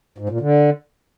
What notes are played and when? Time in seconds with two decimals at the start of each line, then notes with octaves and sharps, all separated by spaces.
0.18 G#2
0.29 A#2
0.40 D3